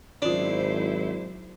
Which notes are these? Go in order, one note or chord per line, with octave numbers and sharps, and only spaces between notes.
G#1 F#3 C#4 D4 E4 F4 C5